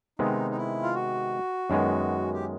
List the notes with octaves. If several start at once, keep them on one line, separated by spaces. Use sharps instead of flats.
C3 D#3 G#3 B3 D#4
D#4
E4
F4
F#4
F#2 D#3 G#3 B3
G4